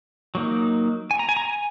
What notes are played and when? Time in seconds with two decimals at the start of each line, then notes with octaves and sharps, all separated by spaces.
0.35 F#3 A#3 D#4
1.11 G#5
1.19 A#5
1.29 G#5
1.37 A#5
1.45 G#5